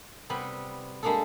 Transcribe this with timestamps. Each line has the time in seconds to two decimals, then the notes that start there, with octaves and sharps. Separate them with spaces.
0.30 C3 G3 B3
1.03 G3 G#3 A#3 D4 G#4 A4